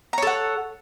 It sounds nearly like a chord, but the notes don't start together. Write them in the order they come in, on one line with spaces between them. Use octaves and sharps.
A#5 C#5 A4 F#5